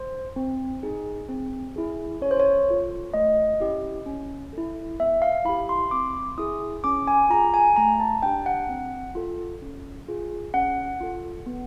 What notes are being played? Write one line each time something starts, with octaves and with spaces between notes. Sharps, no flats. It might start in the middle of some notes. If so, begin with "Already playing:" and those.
Already playing: C5
C4
D#4 G#4
C4
E4 G#4
C#4 C#5
C5
C#5
F4 A4
A3 D#5
C#4 E4 G4
C#4
E4 A4
B3 E5
F5
E4 G4 B5
C6
C4 D6
E4 G#4 D#6
C#4 D6
G#5
F4 G#4 A#5
G#5
A3 A#5
A5
D4 G4 G5
F#5
C4
F4 A4
C#4
F4 G#4
C#4 F#5
F4 A4
B3